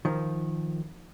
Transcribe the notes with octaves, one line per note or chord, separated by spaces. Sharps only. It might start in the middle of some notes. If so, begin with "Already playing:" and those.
D#3 F3